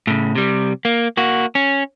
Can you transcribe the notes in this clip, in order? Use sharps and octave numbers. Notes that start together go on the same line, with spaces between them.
A2 C#3
C3 G3
A#3
A#3 F#4
C#4